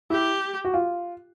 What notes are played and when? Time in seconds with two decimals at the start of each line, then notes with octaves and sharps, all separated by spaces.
0.10 E4 G4
0.65 F#4
0.74 F4